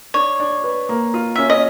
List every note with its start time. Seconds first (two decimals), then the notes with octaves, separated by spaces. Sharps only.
0.14 D4 C#5
0.40 D4
0.64 B4
0.89 A#3
1.14 F4
1.36 C#4 E5
1.50 D#5